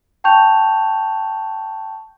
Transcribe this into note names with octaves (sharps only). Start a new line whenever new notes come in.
G5 A5 C#6 G6 F7